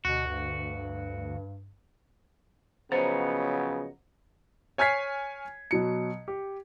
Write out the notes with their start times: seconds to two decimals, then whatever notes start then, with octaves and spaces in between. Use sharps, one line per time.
0.05 D2 B2 F#4
0.27 G2
2.92 C#3 F3 F#3 B3 C5 D#5 F#5 A#5
4.78 C#5 G#5 F6 G#6 B6 C7
5.71 B2 F#3 C#7
6.28 G4